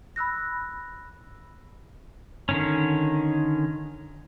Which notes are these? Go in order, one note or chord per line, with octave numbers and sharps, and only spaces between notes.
B5 E6 F#6 A#6
D3 D#3 C#4